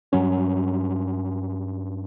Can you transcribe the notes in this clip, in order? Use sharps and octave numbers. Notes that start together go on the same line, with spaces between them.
G2 F#3 C#4